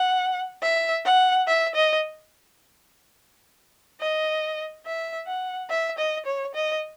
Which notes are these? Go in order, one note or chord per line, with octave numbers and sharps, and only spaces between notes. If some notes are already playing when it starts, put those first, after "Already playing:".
Already playing: F#5
E5
F#5
E5
D#5
D#5
E5
F#5
E5
D#5
C#5
D#5